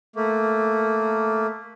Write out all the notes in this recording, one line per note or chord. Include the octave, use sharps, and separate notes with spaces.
A3 A#3